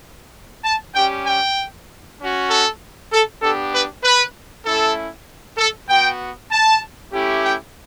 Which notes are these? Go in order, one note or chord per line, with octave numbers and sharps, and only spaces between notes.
A5
G3 C#4 G4 G5
G5
C#4 F#4
A4
A4
B3 D4 G4 A4
B4
B4
A3 C#4 E4 A4
A4
B3 F#4 G5
A5
A3 C#4 E4 G4
G5